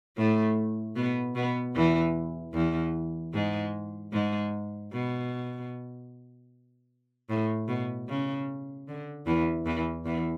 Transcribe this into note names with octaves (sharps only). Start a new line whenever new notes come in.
A2 A3
B2 B3
B2 B3
E2 E3
E2 E3
G#2 G#3
G#2 G#3
B2
A2
B2
C#3
D3
E2 E3
E2 E3
E2 E3